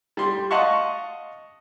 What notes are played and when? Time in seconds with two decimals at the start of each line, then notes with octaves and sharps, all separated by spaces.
0.17 G3 C6
0.51 D#5 F5 F#5 A5 C6 C#6